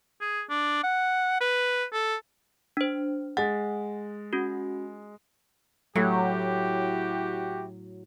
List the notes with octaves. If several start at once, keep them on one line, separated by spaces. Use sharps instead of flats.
G#4
D4
F#5
B4
A4
D4 C5
G#3 F#5 A6
C#4 F#4
A2 F#3 E4 F#4 G4